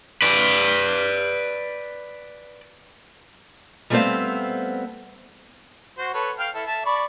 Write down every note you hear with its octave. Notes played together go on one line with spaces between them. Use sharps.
B4 D5
G3 A3 B3 C4 C5 F5
F#4 C5
A4 B4 C#5
F5 G5 F6
E4 A4
E5 A5
D5 B5 C#6